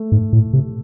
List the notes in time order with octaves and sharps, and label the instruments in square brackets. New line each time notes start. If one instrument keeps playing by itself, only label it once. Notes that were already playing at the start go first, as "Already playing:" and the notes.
Already playing: [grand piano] A3
[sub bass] G#2
A2
C3